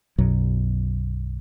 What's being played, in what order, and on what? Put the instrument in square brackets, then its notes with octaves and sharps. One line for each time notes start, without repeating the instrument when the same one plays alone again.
[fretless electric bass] B1 F#2 B2 F#3